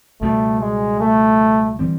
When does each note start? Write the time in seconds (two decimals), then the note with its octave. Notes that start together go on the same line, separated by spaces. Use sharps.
0.21 C#2 B2 G3 A3
0.60 G#3
1.00 A3
1.79 E3 G3 C4